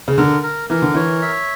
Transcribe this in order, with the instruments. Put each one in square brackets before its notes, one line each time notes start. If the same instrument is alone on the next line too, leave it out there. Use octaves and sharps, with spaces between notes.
[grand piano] C#3
[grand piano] D3 [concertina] A#4
[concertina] A#4
[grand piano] E3 [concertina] A#4
[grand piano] D3
[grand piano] E3 [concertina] C#5
[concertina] E5